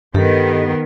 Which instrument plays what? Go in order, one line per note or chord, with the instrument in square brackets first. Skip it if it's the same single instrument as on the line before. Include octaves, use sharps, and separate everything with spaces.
[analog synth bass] G2 [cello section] D#3 B3 [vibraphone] G4 A4